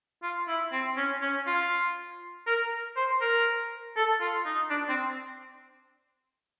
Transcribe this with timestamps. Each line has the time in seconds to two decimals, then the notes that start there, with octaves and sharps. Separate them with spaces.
0.23 F4
0.48 E4
0.72 C4
0.97 C#4
1.21 C#4
1.47 F4
2.47 A#4
2.97 C5
3.21 A#4
3.97 A4
4.21 F4
4.45 D#4
4.70 D4
4.89 C4